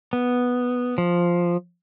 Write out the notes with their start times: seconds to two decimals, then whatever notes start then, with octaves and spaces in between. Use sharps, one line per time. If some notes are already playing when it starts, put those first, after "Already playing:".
0.13 B3
0.98 F3